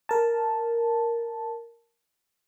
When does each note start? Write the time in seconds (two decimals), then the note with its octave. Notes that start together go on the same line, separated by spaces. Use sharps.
0.09 A#4 A5